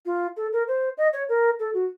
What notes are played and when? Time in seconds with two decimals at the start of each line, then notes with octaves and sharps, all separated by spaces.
0.06 F4
0.37 A4
0.53 A#4
0.68 C5
0.98 D#5
1.13 C#5
1.29 A#4
1.60 A4
1.74 F#4